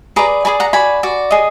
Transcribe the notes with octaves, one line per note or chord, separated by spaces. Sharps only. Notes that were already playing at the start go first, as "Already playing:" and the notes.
G#4 B4 D5 A#5 D6
G#4 B4 D5 G#5 B5
F#5 A#5
F#4 D5 G#5 B5
F#4 D5
G#4 D#5